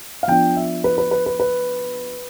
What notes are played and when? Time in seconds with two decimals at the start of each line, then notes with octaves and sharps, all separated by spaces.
0.23 F5
0.27 F3 B3 D4 F4 G5
0.57 E5
0.84 B4
0.98 B4
1.11 B4
1.26 B4
1.40 B4